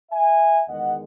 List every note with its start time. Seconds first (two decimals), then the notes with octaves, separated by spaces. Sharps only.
0.12 E5 G#5
0.68 E2 D#3 G#3 D#5 F#5